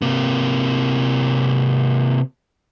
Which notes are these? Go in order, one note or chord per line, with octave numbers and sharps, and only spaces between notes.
C3 A#3